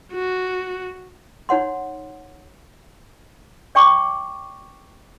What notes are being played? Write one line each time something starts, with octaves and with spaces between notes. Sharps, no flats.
F#4
D#4 C#5 F#5 C6
D5 G5 C#6 D6